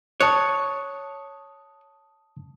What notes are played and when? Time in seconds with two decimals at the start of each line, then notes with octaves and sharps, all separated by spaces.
0.20 C#5 A5 D#6 F#6